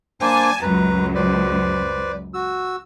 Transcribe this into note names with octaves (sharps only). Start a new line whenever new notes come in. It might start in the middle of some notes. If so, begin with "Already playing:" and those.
A#3 D4 C5 G#5 A5
C#2 F#2 B4 A#5
B4 C5 D5
F#4 E6